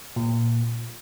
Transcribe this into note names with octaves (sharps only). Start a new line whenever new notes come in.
A#2